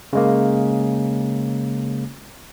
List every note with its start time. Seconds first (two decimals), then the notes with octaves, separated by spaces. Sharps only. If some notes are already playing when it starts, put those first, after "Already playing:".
0.13 C#3 G#3 A#3